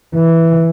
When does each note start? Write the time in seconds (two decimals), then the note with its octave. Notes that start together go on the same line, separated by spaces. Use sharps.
0.15 E3